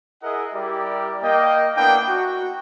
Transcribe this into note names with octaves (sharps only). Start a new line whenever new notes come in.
E4 G#4 A#4 D#5 E5 F#5
G3 E4 G4 A#4 D5
A#3 D#5 G5
A#3 B3 D4 E4 G5
F#4